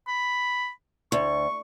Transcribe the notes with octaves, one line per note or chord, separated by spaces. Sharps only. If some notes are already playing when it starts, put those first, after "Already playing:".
B5
D2 C#6